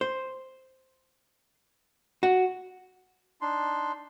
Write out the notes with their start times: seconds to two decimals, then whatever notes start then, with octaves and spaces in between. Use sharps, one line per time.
0.01 C5
2.23 F#4
3.41 D4 D#4 C6